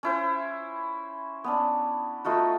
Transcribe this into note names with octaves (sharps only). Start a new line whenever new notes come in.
C#4 E4 C5
B3 C#4 D4
A3 D#4 F4 F#4